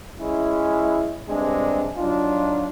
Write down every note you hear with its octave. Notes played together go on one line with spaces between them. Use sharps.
G#3 C#4 E4
G2 C3 G#3 D4 G#4
F#3 D4 D#4 F4